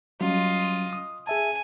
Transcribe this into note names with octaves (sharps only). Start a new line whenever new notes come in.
F#3 G3 C#4 F4 D#5
D#6
G#4 E5 G#5 A5